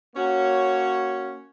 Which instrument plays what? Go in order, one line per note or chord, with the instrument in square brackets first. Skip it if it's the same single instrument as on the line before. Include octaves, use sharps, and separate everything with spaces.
[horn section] A#3 C#4 F#4 C#5